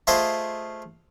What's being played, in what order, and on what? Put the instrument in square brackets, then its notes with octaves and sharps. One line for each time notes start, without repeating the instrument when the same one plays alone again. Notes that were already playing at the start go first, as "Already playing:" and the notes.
[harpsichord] A3 F4 G#4 C5 D#5